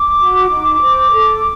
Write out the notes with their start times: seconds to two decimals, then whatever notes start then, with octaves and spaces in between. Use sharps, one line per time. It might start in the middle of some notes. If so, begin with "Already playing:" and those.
Already playing: D6
0.19 F#4
0.50 D#4
0.81 C5
1.12 A4